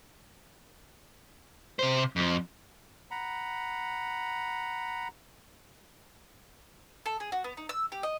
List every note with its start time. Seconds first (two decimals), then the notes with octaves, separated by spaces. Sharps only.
1.79 C3 C5
2.16 F2 F3
3.11 F#5 A#5 B5
7.06 A4
7.20 G#4
7.32 F#4
7.44 B3
7.57 D#4
7.69 E6
7.92 G4
8.03 D#5